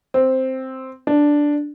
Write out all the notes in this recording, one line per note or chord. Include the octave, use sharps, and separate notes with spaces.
C4
D4